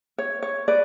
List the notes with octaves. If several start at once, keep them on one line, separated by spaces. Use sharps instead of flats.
C#5
C#5
B4 D5